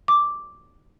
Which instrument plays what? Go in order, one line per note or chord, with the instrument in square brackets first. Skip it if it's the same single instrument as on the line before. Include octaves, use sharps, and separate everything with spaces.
[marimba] D6